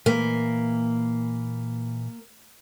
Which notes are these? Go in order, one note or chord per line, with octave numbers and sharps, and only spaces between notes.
A#2 E3 A#3 B4